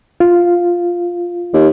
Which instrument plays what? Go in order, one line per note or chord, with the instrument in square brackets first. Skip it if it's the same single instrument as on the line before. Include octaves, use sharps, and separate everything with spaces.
[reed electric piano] F4
[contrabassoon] D#2